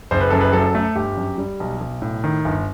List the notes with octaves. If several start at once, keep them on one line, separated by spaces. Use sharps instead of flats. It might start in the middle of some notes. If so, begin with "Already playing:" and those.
F#1 C5
B4
F#2 A4
B4
F#3 A4
A3
G1 G4
F#2
G3
B1
B1
A2
D#3
G1